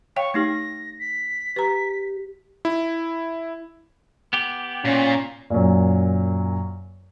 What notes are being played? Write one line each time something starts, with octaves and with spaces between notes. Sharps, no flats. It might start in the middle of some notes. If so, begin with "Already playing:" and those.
C#5 F5 G5 C#6
A3 D#4 G4 A#6
B6
G4 B4 A#5
E4
B3 G4
A#2 C#4
F#2 A#2